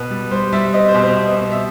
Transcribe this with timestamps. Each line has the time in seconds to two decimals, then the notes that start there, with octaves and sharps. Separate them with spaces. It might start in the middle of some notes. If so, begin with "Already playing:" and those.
Already playing: B2 B4
0.10 G3
0.31 G3 C5
0.53 G3 E5
0.74 C4 D#5
0.88 C5
0.95 B2
1.03 C5
1.16 B2 D#5
1.38 B2
1.52 E5